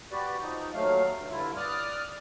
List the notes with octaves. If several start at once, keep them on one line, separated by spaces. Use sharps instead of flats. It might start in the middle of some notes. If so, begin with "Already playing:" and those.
F#4 G4 B4 D5
F3 D#4
D#2 F#3 A3 F5
G2
G2 D3 E4 F4
D5 D6 D#6 F6 F#6